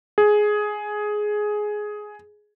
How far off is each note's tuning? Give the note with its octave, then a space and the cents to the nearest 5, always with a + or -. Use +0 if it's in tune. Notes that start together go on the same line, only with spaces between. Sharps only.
G#4 +10